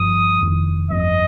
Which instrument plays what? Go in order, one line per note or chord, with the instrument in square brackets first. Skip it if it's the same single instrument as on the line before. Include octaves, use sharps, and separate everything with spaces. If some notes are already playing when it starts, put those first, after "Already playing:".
Already playing: [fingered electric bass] G1 G2 F3 [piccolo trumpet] D#6
[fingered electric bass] F1 F2 D#3
[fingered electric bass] G1 F2 F3 [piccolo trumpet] D#5